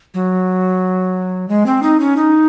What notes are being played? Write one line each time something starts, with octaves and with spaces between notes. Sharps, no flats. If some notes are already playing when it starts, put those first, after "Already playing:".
F#3
G#3
C4
D#4
C#4
D#4